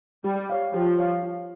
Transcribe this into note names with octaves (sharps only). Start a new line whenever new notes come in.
G3 G4
C#5 F5
F3 G4
C#5 F5
F4